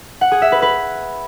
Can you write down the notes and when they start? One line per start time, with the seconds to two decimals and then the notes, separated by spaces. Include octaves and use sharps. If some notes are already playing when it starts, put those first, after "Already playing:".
0.21 F#5
0.31 G#4
0.42 E5
0.52 B4
0.62 B4